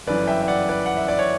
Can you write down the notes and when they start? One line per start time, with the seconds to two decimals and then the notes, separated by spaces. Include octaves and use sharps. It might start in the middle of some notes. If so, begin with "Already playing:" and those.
0.07 G1 F#2 E3 B4 D5
0.27 E5 G5
0.43 E5
0.48 D5 F#5
0.69 B4 D5
0.86 F#5
0.97 E5
1.08 D5
1.19 C#5